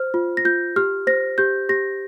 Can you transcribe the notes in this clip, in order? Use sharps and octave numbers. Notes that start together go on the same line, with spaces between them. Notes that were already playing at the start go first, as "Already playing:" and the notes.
Already playing: C5 F6
F4
A#6
F4 G6
G4 F6
C5 A#6
G4 G6
G4 A#6